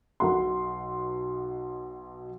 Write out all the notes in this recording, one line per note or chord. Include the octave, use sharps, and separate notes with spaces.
B1 B2 F#5 C6